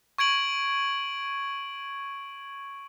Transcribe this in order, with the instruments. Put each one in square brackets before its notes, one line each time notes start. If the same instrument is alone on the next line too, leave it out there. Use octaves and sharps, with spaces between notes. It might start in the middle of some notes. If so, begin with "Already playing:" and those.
[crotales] C#6 G#6 D7 F#7